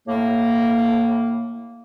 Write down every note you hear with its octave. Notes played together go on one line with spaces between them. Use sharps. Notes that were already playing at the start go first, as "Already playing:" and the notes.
A2 A#3